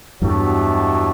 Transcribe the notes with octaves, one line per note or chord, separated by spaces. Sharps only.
E2 G2 B2 F#3 A3 E4 G4